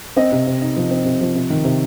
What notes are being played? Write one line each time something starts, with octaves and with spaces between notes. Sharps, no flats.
C4 D#5
C3
C3
D#4
F3
C4
C3
F3
C3
D#3
C3